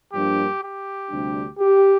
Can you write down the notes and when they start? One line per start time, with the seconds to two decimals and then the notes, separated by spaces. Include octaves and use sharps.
0.13 G2 F3 A#3 D4 G4
0.62 G4
1.10 D2 C3 G3 D4
1.58 G4